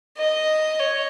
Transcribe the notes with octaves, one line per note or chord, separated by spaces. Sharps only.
D#5
C#5